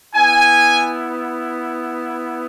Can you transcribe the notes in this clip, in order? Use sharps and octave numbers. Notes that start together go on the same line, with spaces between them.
B3 E4 G#5